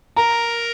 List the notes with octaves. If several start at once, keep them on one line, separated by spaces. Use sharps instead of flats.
A#4 A#5